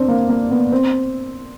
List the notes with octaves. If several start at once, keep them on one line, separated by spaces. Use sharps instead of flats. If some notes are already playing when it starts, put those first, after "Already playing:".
Already playing: C4 D4
A#3
A#3
B3
C4